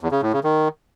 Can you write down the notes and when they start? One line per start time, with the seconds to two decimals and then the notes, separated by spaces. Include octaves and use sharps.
0.01 E2
0.12 C#3
0.22 A2
0.33 C#3
0.44 D#3